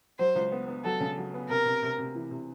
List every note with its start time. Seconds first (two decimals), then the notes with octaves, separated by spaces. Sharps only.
0.19 F#3 C5
0.35 C#2
0.52 B3
0.68 B3
0.84 F#3 A4
1.00 C#3
1.18 F#3
1.34 B3
1.50 C3 A#4
1.65 C3
1.83 C3
1.99 C3
2.15 E3
2.31 C3